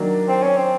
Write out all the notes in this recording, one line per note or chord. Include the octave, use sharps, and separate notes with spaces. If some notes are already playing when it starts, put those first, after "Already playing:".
Already playing: D#3 F#3 A#3 D4
C4
C#4
C4